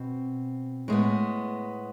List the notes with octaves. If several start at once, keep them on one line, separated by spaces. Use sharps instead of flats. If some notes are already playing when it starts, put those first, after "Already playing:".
Already playing: B2 C4
A2 G#3 B3